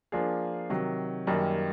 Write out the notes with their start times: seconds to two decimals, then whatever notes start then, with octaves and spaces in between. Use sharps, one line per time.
0.12 F3 A#3 D4 F4 G#4
0.70 C3 D#3 F#3
1.27 F#2 D#3 G3 A#3